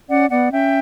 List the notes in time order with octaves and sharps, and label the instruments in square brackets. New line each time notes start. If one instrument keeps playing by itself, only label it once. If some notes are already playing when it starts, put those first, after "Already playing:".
[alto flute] C#4 [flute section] D5 F#5
[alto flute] B3 [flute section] D5 F#5
[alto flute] C#4 [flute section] E5 G5